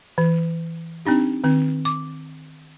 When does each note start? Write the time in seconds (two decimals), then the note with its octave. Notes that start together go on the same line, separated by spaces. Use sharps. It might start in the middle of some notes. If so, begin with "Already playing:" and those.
0.18 E3
1.06 C4 D4 D#4 G4
1.44 D#3 C4
1.85 D6